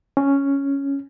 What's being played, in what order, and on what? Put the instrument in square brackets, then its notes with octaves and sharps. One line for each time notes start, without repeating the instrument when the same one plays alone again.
[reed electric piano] C#4